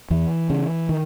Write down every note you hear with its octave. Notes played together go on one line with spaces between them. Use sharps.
E2 E3
C#3
D#3